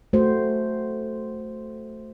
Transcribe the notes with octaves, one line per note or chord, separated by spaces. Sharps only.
A3 F#4 C5